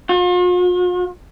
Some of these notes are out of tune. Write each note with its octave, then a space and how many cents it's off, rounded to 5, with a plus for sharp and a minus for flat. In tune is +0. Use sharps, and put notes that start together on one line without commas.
F4 +45